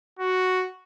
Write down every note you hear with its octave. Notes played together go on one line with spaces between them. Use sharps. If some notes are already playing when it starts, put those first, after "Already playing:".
F#4